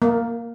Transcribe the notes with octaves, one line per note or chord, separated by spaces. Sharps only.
A#3